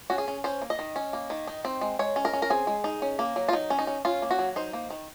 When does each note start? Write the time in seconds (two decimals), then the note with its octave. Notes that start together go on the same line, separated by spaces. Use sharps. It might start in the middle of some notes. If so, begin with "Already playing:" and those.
0.10 C#4 F#4
0.18 G#4
0.28 C#4
0.44 C#4 C5
0.62 A#3
0.70 D#5
0.79 D#3
0.96 C#4
1.13 A#3
1.30 D#3
1.47 D#4
1.65 C4
1.81 G#3
1.99 G#3 C#5
2.16 C#4
2.25 A#4
2.33 C#4
2.42 A#4
2.50 C4 G#4
2.67 G#3
2.84 D#4
3.02 C#4
3.19 A#3
3.36 F#3
3.48 F4
3.53 F#3 D#4
3.70 C#4
3.79 D#4
3.87 C#4
4.05 C#4 F4
4.22 A#3
4.31 F#4
4.39 F#3
4.56 D#4 C5
4.73 A#3
4.90 D#3